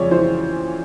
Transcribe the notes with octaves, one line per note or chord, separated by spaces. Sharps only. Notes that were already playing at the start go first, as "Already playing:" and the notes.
Already playing: F2 C#3 G#3 F4 C#5 D5
E3 C5